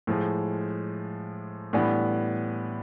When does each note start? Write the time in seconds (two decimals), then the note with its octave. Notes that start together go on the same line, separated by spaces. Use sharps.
0.07 A2 F3 G#3
1.73 A2 E3 G3 B3 D4